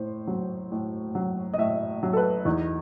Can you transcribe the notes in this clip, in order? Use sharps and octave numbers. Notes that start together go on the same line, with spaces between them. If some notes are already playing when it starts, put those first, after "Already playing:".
Already playing: A2 C5
F#3
A2
F#3
D#5
A2 E5
F#3
A4
B4
E2 D#4